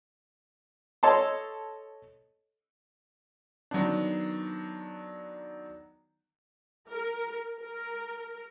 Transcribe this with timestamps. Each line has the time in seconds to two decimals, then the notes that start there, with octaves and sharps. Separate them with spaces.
1.03 A4 C#5 D#5 A5 C6
3.71 D#3 F#3 B3 D4
6.89 A#4
7.60 A#4